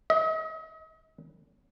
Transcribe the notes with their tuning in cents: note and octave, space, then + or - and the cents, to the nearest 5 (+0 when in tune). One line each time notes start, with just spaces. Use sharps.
D#5 +45